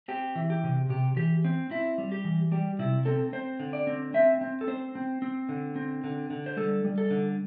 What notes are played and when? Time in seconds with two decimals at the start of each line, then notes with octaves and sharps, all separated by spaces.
0.08 C4 G4
0.35 E3
0.50 G4
0.64 C3
0.89 C3 G4
1.16 E3 G4
1.45 C4
1.70 C4 E4
1.98 G3
2.12 G4
2.24 E3
2.51 G3 G4
2.79 C3 E4
3.05 C4 A4
3.33 C4 C5
3.60 D3
3.73 D5
3.87 C4
4.14 C4 E5
4.41 C4
4.61 A4
4.68 C4 C5
4.95 C4
5.22 C4
5.49 D3
5.76 C4
6.04 D3
6.30 D3
6.46 C5
6.57 G3 A4
6.85 G3
6.98 A4
7.11 D3